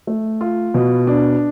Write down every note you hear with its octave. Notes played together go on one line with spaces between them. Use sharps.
A3
F4
B2
D4